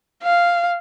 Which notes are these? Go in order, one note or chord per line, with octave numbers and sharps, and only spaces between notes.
F5